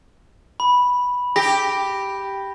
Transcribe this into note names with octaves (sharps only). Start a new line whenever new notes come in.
B5
G4 A#6